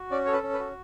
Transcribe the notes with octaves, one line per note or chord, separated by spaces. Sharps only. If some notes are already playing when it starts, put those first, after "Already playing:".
Already playing: F#4
C#4 D5
C#5
A4 B4
C#4
B4
F#4